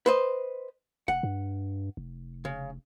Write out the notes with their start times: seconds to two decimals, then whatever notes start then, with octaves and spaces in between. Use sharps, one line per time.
0.06 B4 C5 D#5
1.08 F1 F#5
1.23 G2
1.97 F1
2.45 C#3